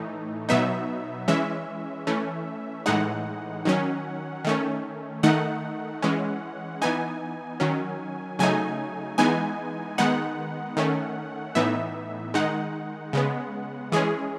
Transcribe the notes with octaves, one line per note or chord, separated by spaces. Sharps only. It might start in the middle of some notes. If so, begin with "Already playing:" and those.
Already playing: A2 E3 A3 D#4
B2 F#3 B3 D#4 E5
E3 G#3 C#4 E5
E3 A3 C#4
A2 E3 G#3 D#4 F#5
D#3 F#3 C#4
D#3 A3 C#4
D#3 A3 D#4 F#5
E3 G#3 C#4
E3 B3 D#4 G#5
D#3 F#3 C#4
C#3 F#3 A3 D#4 G#5
E3 G#3 B3 D#4 G#5
D#3 G#3 B3 D#4 F#5
D#3 A3 C#4
A2 E3 B3 D#4 E5
D#3 G#3 D#4 F#5
C#3 G#3 B3
E3 G#3 C#4 G#4